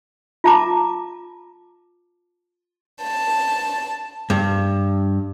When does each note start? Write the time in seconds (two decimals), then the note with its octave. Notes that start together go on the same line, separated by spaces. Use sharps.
0.44 F4 E5 A5 A#5 D6
3.01 A5
4.30 G2